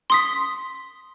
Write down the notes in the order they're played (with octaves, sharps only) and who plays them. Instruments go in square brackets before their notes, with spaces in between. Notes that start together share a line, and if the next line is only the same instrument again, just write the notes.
[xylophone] C6 D#6 B6